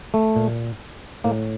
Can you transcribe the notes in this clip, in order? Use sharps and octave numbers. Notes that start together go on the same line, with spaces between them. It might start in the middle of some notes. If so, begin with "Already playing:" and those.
A3
A#2
A2 A#3